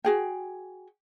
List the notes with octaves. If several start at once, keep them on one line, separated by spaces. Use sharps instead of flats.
F#4 G#4 G5